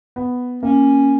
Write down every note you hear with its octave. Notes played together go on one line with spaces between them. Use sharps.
B3
A#3 C#4